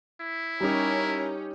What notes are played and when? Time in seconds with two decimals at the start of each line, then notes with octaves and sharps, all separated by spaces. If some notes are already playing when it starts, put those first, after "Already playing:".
0.21 E4
0.61 G3 C#4 D#4 G4 A#4